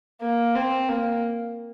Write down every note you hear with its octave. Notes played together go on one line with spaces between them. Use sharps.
A#3
C4
A#3